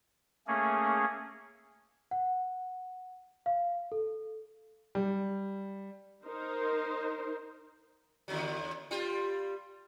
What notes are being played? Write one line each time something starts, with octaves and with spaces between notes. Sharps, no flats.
A3 A#3 C#4 G#4
F#5
F5
A4
G3
D#4 A#4 C5
D#2 D3 F#3
G3 F4